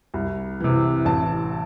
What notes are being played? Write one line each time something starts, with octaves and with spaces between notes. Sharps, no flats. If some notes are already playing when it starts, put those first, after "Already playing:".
C2
C3 E3
A1 A5